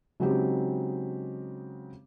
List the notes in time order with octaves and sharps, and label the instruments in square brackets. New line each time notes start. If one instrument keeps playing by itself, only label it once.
[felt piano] C#3 F#3 G#3 C4 D#4 G4